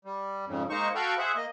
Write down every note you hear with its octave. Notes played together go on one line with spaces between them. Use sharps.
G3
F2 G#2 C#3
G#3 A#3 D#4 C5 C#6
F#4 A4 F5 G5 B5 C#6
G#4 C5 E5 F#5
A#3 D#5